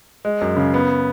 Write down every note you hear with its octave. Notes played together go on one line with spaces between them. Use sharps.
G#3
F#2
C#3
B3